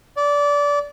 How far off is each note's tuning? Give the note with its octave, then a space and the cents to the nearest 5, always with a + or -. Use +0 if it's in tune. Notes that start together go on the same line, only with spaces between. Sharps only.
D5 -20